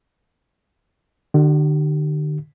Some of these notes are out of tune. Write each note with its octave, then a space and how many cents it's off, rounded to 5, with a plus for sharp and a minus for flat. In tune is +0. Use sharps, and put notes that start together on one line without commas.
D3 +40 G4 -30